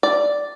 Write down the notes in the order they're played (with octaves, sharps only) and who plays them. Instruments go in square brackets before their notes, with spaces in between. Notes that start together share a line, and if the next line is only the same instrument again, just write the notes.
[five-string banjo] D5